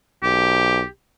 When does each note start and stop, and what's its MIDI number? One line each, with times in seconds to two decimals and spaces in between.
0.23 0.83 35
0.23 0.87 67